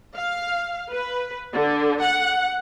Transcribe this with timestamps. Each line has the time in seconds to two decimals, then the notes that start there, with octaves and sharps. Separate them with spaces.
0.15 F5
0.91 B4
1.54 D3
2.02 F#5